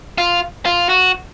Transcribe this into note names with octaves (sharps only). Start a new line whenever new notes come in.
F4
F4
F#4